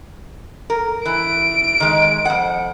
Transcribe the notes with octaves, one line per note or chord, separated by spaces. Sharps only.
A#4
E3 D7
D#3 G#3
F2 F#5